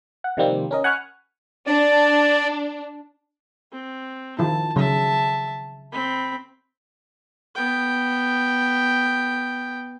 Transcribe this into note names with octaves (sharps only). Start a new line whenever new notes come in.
F#5
C3 D#3 F3 G3 A#3 C4
C#4 A#4 D#5
F#5 G#5 B5 C#6 F6 F#6
D4 D5
C4
D#3 F3 E4 A5
C#3 F#3 E5 A5
C4 B5
B3 G5